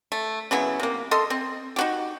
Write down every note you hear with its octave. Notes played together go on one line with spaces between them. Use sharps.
A3
C#3 F#3 B3 E4
C3 A#3
A4 D#5 C6
C4
D#4 F#4 G4